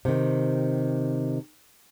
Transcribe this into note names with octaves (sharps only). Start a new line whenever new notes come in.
C3 D#3